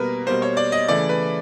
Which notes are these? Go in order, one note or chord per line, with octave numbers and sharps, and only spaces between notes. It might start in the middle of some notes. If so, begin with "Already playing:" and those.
Already playing: B2 G3 A#3 A#4 B4
B2 G3 A#3 C5
C#5
D5
D#5
C#3 E3 A3 D5
B4